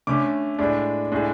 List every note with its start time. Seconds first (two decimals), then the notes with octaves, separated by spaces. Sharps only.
0.07 D3 A3 C#4 D6
0.59 A2 G#3 D4
1.12 A2 G#3 D4